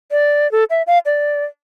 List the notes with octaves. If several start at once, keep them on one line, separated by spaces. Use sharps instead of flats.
D5
A4
E5
F5
D5